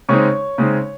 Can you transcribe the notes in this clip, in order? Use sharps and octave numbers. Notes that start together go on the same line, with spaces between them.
C#3 G#3 C4 D#4 C#5 C#6
C#3 G#3 C4 D#4